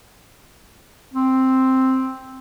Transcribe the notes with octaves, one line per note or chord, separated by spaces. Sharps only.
C4